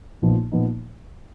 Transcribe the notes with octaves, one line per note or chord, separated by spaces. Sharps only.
A#1 A#2 F3 B3 D#4
A#2 F3 B3 D#4